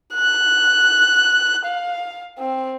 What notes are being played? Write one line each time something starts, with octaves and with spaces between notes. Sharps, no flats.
F#6
F5
C4